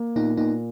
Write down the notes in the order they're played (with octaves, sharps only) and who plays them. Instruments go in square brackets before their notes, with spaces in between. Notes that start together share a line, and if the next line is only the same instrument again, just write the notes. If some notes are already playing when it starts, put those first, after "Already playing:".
Already playing: [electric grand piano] A#3
[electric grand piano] A#2 [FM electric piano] B3 D#4
[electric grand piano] A#2 [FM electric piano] B3 D#4